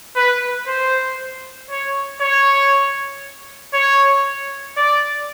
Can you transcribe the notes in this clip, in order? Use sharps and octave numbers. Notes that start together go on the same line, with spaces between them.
B4
C5
C#5
C#5
C#5
D5